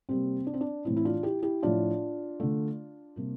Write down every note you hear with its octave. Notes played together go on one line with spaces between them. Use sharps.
C3 G3 A#3 C4
D4
C4
D4
A2 E3 A3 C4 E4
E4
D4 F4
E4 G4
E4 G4
A2 F3 A3 D4 F4
D3 A3
C3 G3 A#3